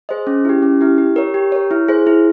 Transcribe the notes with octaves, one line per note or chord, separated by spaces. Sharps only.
G#4 C5 D#5
C#4
E4 G4
C#4
E4 G4
G4
A#4 C#5
G4
A#4 C#5
E4
G#4 C5
E4